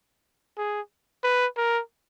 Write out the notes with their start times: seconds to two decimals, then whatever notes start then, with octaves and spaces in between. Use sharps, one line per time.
0.58 G#4
1.23 B4
1.57 A#4